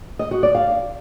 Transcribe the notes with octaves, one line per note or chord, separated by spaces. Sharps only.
D#5
F#4
D5
F5